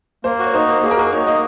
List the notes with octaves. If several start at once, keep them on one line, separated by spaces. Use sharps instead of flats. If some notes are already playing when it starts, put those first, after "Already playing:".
A#3 C5
F#4 C#5
D#4 C5
A#3
A#3 G#4
A#4
F#4 G#4
D#4 C#5
A#3 D#5